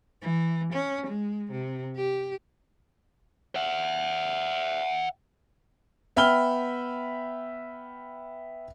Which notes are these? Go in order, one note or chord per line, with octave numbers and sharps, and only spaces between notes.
E3
C#4
G#3
C3
G4
E5 F#5
B3 E5 G5 B5 F6 G7